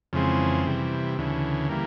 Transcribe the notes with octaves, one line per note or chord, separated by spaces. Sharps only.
F2 C#3 E3 G#3 C4
C3 E3 G3
D2 C#3 E3
E3 G3 A#3